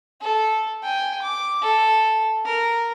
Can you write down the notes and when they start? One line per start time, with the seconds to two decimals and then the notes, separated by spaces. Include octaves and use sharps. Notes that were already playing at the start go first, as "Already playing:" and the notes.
0.21 A4
0.83 G5 G#5
1.22 D6
1.62 A4
2.46 A#4